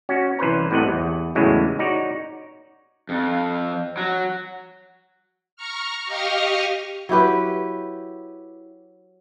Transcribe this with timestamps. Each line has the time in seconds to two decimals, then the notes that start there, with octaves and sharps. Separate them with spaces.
0.09 C#4 F#4
0.39 C2 E3 C#4 B4 C5 A#5
0.71 C2 A2 C3 D#5 F#5
0.88 E2
1.35 E2 A2 C#3 E3 F#3 G#3
1.79 D#4 F#4 C#5 D5
3.09 F2
3.97 F#3
5.56 A#5 C#6 F6
6.06 G4 D#5 F5 C#6 D#6 F6
7.09 F#3 E4 G4 B4